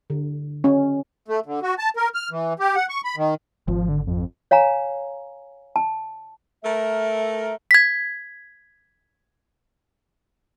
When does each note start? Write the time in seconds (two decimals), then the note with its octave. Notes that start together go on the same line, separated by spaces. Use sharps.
0.10 D3
0.64 C#4
1.28 A3
1.46 D3
1.62 F#4
1.78 A5
1.96 A#4
2.14 F6
2.31 E3
2.59 G4
2.76 F#5
2.89 C#6
3.04 B5
3.17 D#3
3.68 G#1 F3
3.89 D3
4.07 F2
4.51 C#5 F5 G#5 A#5
5.76 A5
6.64 A3 A#4 E5
7.71 G#6 B6